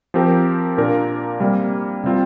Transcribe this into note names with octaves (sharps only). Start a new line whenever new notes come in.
F3 C4 G4 A#4
A#2 A#3 D4 A#4
C3 G3 A#3
C3 G3 C4 F4